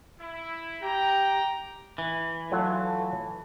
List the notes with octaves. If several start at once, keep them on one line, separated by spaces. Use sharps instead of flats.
E4
G4 G5 A#5
E3
F#3 A3 F4